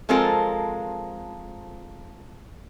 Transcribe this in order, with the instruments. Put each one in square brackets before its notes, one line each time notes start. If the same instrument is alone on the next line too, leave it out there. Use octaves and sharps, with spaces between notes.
[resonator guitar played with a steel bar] F3 G#3 C4 F4 A4 A#4